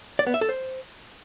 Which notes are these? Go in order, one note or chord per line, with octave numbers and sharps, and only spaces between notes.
D5
B3
E5
A4
C5